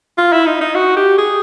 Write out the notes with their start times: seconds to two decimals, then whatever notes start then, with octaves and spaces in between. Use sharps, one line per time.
0.18 F4
0.33 E4
0.46 D#4
0.61 D#4
0.75 F#4
0.97 G4
1.18 G#4